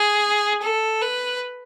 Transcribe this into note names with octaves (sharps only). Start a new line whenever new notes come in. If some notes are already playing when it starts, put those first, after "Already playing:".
Already playing: G#4
A4
B4